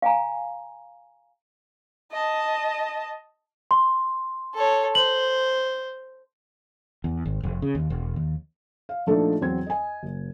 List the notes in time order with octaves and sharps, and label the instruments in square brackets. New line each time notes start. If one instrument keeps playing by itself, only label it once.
[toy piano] F5 G#5 A#5
[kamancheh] D#5 A5
[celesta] C6
[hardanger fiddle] A4 C#5
[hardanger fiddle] C5 [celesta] F#7
[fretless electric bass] E2
G#1
F1
C#3
D#2
E1
D#2
[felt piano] F5
A#2 F3 A3 D4 D#4 A4
E2 F#3 C4 G#6
D#5 G#5
F#1